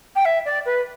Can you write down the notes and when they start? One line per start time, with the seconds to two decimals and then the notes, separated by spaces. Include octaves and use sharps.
0.16 G5
0.25 E5
0.45 D5
0.66 B4